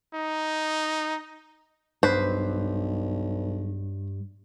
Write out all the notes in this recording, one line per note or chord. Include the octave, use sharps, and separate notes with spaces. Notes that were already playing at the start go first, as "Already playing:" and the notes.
D#4
B1 G2 B4 C5